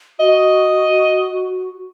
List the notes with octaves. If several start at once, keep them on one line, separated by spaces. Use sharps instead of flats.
F#4 D#5